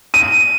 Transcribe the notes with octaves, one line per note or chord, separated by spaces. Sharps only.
D#7